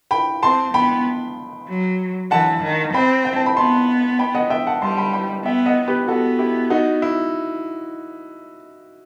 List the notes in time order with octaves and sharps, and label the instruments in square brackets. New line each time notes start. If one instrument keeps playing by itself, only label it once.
[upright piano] G5 B5
[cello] C4 [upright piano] A5 C6
[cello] B3 [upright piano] G5 B5
[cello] F#3
[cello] E3 [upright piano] F#5 A5
[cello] D#3
[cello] C4 [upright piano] G5 B5
[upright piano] G5
A5
B5
[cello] B3 [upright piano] A5 C6
[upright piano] G5 B5
D#5 F#5
E5 G5
F#5 A5
[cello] G3 [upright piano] A5 C6
[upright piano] G5 B5
G5 B5
[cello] B3 [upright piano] E5 G5
[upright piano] D#5 F#5
G4 B4
[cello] B3 [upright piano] F#4 A4
[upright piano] E4 G4
D#4 F#4
E4